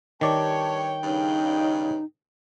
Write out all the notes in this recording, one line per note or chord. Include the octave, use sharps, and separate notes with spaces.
G2 D#3 G4 C#5 D5 G5 A5
G2 C#3 D#4